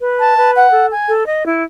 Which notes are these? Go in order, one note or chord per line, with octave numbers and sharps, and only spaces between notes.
B4
A5
B4
F#5
A4
G#5
A4
D#5
E4